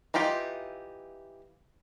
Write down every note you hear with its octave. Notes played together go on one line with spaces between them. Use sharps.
E3 D#4 F4 G4